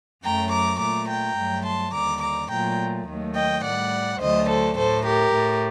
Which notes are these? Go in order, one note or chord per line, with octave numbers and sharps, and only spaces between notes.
F#2 F#3 A3 G5 A#5
A#5 D6
A#2 A3 A#5 D6
G5 A#5
G2 F#3 A3
A5 C6
D#2 D3 G3 A#5 D6
A#5 D6
A#2 F#3 A3 G5 A#5
D#2 D#3 F#3 A3
D#5 G5
A2 G3 D5 F#5
D2 D3 F#3 A3 C5 D#5
A4 C5
A2 A3 A4 C5
G4 A#4
A2 A3